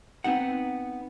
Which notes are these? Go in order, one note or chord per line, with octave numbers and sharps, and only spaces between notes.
B3 C4 D#4 F#5